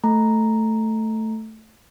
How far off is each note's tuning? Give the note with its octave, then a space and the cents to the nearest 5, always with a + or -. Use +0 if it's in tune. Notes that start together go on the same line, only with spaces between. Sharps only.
A3 +0 A#5 +0